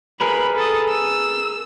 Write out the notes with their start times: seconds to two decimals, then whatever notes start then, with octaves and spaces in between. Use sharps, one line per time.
0.21 G#4 A#4 B4 B5
0.56 A4 D#6
0.89 E6